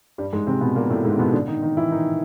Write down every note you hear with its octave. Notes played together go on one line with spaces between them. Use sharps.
G2 G3
G#2 G#3
C3 C4
B2 B3
A#2 A#3
A2 A3
G#2 G#3
C4
B2 B3
D3 D4
D#3 D#4
D#3 D#4
E3 E4
D#3 D#4